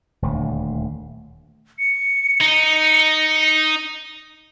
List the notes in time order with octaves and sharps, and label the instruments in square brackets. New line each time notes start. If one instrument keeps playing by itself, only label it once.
[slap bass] D#1 D2
[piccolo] C#7
[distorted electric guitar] D#4